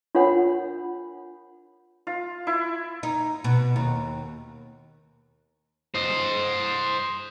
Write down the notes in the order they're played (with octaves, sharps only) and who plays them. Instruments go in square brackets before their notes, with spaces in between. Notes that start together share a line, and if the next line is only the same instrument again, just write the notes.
[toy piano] D4 F4 A#4 C#5 F#5 B5
[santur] F4
E4
[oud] D#4
B2
D#2
[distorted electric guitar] C5 D#5